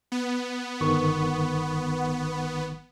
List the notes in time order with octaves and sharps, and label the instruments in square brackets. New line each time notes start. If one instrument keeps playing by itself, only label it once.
[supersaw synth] B3
[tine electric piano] G1 D#3 C#6